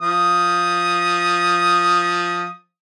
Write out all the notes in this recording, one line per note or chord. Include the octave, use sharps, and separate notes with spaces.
F3 D#6